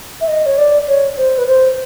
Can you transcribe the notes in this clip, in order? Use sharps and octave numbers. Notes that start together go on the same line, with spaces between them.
E5
D#5
C#5
D5
C#5
C5
B4
C5